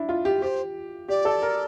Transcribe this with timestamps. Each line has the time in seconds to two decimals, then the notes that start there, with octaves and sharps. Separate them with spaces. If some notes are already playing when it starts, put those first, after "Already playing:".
Already playing: D4 E4
0.09 F4
0.25 G4
0.41 G4 C5
1.08 G4 D5
1.25 A4
1.42 A#4